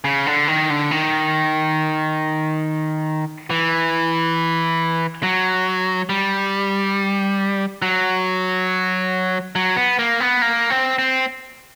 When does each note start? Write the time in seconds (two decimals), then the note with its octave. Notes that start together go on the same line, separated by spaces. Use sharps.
0.04 C#3
0.26 D3
0.48 D#3
0.70 D3
0.91 D#3
3.50 E3
5.23 F#3
6.09 G3
7.82 F#3
9.55 F#3
9.76 B3
9.99 A#3
10.20 B3
10.42 A#3
10.70 C4
10.99 C4